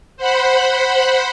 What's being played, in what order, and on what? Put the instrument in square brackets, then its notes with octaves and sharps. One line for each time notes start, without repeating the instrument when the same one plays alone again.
[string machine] C5 F#5 B5